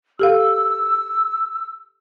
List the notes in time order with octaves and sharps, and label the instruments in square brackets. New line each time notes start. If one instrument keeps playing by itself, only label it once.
[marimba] G4 A4 F5 [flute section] E6